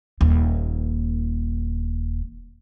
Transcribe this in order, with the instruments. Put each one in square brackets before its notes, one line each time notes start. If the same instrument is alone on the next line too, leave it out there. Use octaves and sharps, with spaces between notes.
[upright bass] D#1 D#2